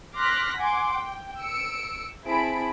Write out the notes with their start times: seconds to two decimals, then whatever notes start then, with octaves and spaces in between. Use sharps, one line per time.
0.16 C6 D6 F6 F#6 A#6 B6
0.58 F#5 G#5 C6 D6
0.93 G5
1.40 E6 C#7 D7
2.24 C4 E4 G#4 A5 B5 D7